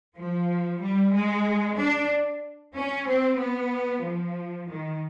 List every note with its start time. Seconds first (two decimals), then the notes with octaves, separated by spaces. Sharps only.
0.17 F3
0.80 G3
1.12 G#3
1.76 D4
2.74 C#4
3.06 C4
3.38 B3
4.02 F3
4.67 D#3